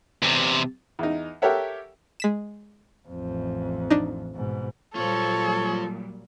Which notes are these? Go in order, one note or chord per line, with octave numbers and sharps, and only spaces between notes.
E2 C3
E2 D#4
G4 A4 A#4 C#5 E5 F#5
G#3 B6 E7
A1 F2
D4 D#4
G#2 B2
A#2 F#3 G3 F4 A4 C5 C#5